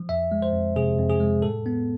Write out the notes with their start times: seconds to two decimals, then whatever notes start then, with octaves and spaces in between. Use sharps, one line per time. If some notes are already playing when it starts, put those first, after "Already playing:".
Already playing: F3
0.09 F2 E5
0.32 G#3
0.42 C5
0.53 F2
0.76 C3 G#4
0.99 F2
1.10 G#4
1.20 G#3
1.42 A2 A4
1.66 B3